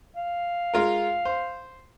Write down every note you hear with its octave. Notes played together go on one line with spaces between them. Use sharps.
F5
G#3 F4 A#4
C5